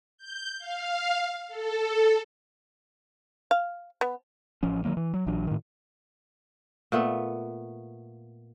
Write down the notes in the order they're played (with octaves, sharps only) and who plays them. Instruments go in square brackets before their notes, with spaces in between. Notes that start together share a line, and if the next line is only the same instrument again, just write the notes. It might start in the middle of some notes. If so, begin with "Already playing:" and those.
[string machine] G6
F5
A4
[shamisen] F5
B3
[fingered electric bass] A1 F3 C#4
D#3 F#3 A#3
E3
F#3
A#1 E3 F#3 D4
A2 D#3
[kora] A#2 A3 B3